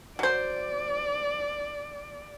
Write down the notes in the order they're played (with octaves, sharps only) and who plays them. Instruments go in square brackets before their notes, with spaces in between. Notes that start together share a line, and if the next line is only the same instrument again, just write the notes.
[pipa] F#3 C5 [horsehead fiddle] D5